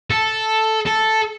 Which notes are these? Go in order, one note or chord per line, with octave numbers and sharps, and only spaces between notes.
A4
A4